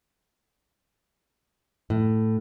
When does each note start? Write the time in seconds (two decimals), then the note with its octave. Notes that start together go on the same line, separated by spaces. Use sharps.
1.90 A2